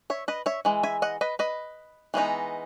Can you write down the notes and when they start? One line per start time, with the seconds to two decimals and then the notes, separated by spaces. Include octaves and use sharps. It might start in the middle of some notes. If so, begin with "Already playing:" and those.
0.10 C#5 E5
0.28 B4 D#5
0.46 C#5 E5
0.65 E3 G#3
0.83 E5 G#5
1.02 D#5 F#5
1.21 B4 D#5
1.39 B4 D#5
2.14 E3 G#3 B3 D#4